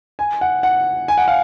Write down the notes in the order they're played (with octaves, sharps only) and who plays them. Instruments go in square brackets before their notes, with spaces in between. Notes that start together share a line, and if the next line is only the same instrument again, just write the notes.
[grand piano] G#5
F#5
F#5
G#5
F#5
F5